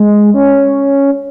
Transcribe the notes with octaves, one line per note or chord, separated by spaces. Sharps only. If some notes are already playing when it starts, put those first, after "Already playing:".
Already playing: G#3
C#4